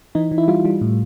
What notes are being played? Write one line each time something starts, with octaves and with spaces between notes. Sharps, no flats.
E3 D#4
E3
E4
G3 F4
G3
A2